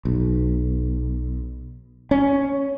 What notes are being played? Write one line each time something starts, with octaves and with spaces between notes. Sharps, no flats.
B1
C#4